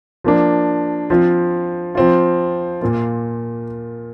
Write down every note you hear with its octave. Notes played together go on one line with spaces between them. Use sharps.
F3 A#3 D4
F3 C4 F4
F3 C4 F4
A#2 A#3 F4